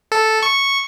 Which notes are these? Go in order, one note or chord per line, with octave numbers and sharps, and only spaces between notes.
A4
C#6